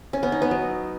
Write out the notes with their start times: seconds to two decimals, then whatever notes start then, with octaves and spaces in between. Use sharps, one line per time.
0.13 C#4
0.23 B3
0.32 D#4
0.42 B3
0.51 F#3